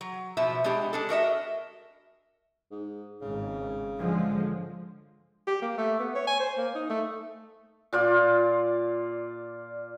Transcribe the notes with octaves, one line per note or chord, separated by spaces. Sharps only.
F#3
B2 F3 E5
G#3 B3 D4 G4
G#3 D4 A4
F#4 A#4 D#5 E5
G#2
G#1 G#2 C#3
D3 F3 G#3
G4
A#3
A3
B3
C#5
G#5
C5
A#3
D#4
A3
A#2 F4 D5